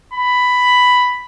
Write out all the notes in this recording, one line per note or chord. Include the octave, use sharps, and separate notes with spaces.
B5